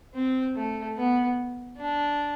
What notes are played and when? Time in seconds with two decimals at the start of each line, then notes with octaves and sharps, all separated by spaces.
0.14 C4
0.55 A3
0.96 B3
1.78 D4